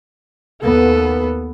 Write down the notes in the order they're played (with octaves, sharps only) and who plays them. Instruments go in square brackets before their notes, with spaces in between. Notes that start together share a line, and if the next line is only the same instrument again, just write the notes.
[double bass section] D#2 B3 [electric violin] A4